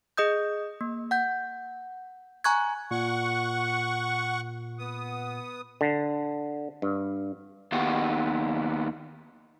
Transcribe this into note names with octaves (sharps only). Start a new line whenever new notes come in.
G#4 D#5 D#6 G6
A#3
F#5 G6
G#5 A#5 C#6 F#6 G#6
A#2 F#5 C#6
B3 D#6
D3
G2
D#2 B3